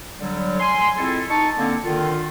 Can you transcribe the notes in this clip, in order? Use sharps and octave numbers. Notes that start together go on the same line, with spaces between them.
D3 F#3 G3
G#5 C6
G#3 C4 E4 F4 A4
D#4 A5 C#6
D3 A#3 C4
D3 D#3 F4